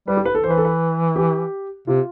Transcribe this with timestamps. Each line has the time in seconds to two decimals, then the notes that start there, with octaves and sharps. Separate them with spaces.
0.08 G3 B4
0.17 G4
0.25 B4
0.35 A4
0.43 E3 C5
0.50 B4
0.58 A4
0.65 B4
1.16 G4
1.87 C3 F4